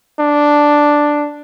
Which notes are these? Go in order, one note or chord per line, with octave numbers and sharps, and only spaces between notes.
D4